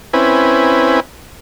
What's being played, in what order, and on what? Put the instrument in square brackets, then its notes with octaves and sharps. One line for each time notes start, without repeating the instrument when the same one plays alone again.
[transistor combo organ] C4 C#4 E4 B4 G#5